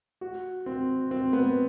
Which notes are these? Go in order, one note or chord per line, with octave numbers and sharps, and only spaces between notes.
F#4
C4
C4
B3